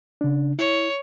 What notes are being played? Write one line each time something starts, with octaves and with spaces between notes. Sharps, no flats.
C#3 D4
E4 C#5